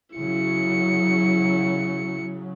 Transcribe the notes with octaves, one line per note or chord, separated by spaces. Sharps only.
C#3 F#3 E4 C#7